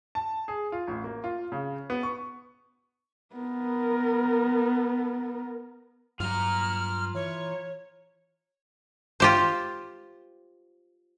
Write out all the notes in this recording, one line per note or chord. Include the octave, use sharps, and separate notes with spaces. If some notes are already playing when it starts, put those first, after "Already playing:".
A5
G#4
F4
A1
A#3
F4
C#3
B3
C#6
B3 A#4
G2 F#3 F4 A#5 F6
E3 C#5
F4 G4 C5